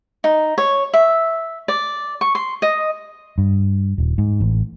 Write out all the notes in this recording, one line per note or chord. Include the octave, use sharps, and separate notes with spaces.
D#4
C#5
E5
D5
C#6
C6
D#5
G2
D#1
G#2
A1